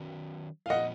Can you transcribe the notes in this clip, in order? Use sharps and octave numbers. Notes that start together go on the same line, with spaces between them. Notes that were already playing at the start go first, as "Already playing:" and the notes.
Already playing: D#3 F#3 C#4 F#4
F5
A#2 F3 B3 F4 D#5 F#5